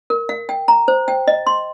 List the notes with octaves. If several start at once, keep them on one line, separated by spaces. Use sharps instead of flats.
A#4
F5
G5
A#5
C5
G5
D#5
C6